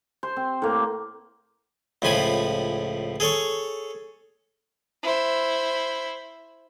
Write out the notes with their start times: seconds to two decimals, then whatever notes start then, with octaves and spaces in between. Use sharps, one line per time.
0.23 C5
0.36 C4
0.62 A2 A#3
2.02 C#2 A2 F3 G#5 B5
3.20 G#4 A4 C#5 C#6
5.03 E4 C5